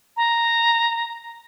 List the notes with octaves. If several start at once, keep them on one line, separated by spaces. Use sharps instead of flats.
A#5